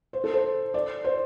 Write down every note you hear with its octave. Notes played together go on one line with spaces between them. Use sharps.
C5
A4
C5
D5
C5